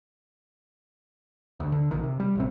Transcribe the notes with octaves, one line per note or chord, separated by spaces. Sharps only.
D2
D3
A#1 D#3
C3
G3
A1 C3 C4